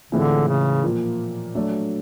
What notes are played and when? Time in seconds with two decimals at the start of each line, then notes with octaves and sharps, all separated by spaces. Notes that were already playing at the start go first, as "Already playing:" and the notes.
0.12 A2 D3 E3 G#3 C4 F4
0.48 C#3
0.83 A#2 F3 A#3
1.55 F#3 A3 D4